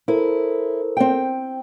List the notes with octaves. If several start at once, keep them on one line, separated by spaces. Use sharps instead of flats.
E4 A4 A#4 C5
C4 G5